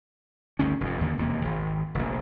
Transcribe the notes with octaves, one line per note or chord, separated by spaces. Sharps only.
G1 D2 D#3 C#4
F1 F2
D#2 D3 A#3
E1 D#2 C3 A#3
G#1
F1 A#1